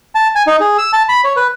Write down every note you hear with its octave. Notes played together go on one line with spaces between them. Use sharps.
A5
G#5
D#4
G#4
E6
A5
B5
C#5
B4